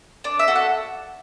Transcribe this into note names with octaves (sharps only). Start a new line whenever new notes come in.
D4 D5
E5
F#4 A4
F#5